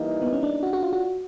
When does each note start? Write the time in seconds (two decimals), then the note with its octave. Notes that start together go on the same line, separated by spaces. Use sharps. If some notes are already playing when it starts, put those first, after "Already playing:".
Already playing: E3 G3 A#3 D#4
0.22 B3
0.33 C#4
0.43 D4
0.63 F#4
0.73 F#4
0.83 F4
0.93 F#4